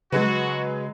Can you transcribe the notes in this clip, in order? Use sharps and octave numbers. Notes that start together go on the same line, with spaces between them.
C#3 F#3 G#3 F#4 B4